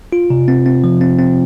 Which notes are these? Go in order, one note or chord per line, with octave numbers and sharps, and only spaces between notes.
F4
C3
C4
C4
F3
C4
C4